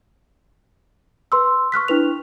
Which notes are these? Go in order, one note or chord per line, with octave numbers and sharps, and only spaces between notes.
B4 C6 E6
C#6 F6 F#6 B6
D4 E4 B4 F7